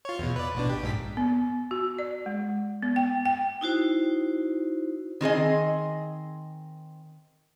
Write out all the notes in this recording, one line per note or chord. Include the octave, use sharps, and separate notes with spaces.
F4 C#5
E2 B2
B4 D5
A1 B2 D4
G4
A#1 G#2 B6
B3
F#4
D5
G#3
B3
G5
G5
D#4 E4 F#4 C5
D#3 C4 G#4 D#5